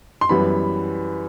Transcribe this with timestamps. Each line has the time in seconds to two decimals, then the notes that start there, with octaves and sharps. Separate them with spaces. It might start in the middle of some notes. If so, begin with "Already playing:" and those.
0.21 C6
0.29 F#2 E3 G3 B3 B5